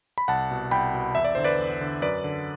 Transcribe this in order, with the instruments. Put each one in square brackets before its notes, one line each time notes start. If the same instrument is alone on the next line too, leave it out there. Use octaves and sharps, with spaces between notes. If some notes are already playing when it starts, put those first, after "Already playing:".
[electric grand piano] B5
C2 F#5 A5
B2
C2 G5 B5
B2
E2 E5
D5
D3 C5
B4 D5
E2
D3
F#2 B4 D5
D3